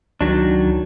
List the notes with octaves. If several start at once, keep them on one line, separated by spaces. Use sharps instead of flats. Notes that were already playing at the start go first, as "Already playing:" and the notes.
C#2 D#3 F#3 D4